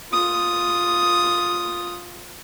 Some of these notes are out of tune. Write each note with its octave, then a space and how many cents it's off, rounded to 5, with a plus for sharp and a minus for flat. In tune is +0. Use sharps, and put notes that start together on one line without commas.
F4 +5 D#6 +0